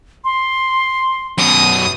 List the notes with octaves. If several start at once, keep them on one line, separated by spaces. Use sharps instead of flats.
C6
F#2 B2 D#6